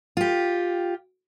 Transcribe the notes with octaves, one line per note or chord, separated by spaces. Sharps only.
F4 G4